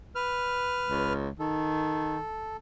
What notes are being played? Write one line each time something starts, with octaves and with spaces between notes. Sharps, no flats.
B4 F6
C#2
D#3 A4